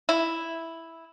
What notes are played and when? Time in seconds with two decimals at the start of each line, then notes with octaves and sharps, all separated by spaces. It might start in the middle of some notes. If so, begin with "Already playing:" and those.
0.09 E4